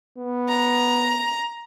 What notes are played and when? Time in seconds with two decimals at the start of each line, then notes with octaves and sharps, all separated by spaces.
0.17 B3
0.49 A#5